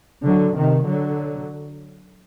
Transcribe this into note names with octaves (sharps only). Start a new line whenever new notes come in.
D3 F#3
C3 D#3
D3 F#3